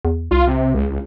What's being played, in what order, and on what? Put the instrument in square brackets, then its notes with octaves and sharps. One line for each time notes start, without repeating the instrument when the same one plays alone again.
[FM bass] E2
[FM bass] C2 [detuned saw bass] F4
[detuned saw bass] C3
C#2